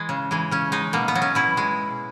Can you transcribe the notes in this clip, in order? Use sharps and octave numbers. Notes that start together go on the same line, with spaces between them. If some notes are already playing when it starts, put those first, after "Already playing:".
Already playing: E3 G#3
C#3
E3 G#3
C#3 C#4
G#3 D#4
B2 A#3
B3
F#3
C#4
B2 E4
G#3